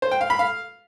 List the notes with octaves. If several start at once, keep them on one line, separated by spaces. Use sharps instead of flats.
C5
G5
F5
B5
F5